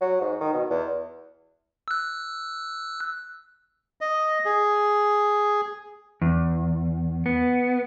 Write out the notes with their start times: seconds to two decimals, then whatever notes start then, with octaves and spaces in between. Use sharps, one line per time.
0.01 F#3
0.21 G#2
0.41 D#3
0.53 B2
0.70 E2
1.88 E6 F#6
4.01 D#5
4.45 G#4
6.22 E2
7.26 B3